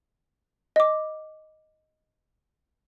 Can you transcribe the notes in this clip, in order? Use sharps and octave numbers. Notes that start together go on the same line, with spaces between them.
D#5 D6